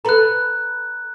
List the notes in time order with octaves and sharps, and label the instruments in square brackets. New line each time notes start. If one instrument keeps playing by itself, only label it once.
[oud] A4 B4 [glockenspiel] A#5 F#6